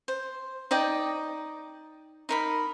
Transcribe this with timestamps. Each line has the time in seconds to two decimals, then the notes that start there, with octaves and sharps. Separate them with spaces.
0.08 C5
0.71 D#4 D5 D#5 G5
2.29 D#4 A#4 B5